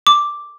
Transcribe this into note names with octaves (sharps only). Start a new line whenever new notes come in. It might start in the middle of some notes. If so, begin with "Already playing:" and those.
D6